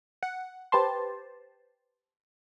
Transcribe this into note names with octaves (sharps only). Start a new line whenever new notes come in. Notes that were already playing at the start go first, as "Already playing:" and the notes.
F#5
G4 B4 C5 A5 C6